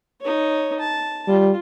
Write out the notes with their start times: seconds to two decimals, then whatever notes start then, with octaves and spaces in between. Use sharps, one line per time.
0.21 D#4 C#5
0.80 A5
1.28 G3 F4